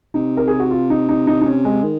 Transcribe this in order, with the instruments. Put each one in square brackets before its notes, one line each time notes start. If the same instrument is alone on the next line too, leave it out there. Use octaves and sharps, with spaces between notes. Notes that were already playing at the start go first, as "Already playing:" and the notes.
[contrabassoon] C3 [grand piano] D#4
[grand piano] A#4
G#4
F#4
F4
D#4
D#4
D#4
D#4
C#4
G#3
[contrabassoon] D#3